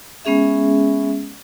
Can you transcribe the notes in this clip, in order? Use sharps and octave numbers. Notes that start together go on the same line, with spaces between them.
G#3 B3 C#4 G#4 E5